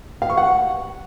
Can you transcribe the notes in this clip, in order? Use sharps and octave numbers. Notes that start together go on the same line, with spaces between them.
F5
C#6
F#5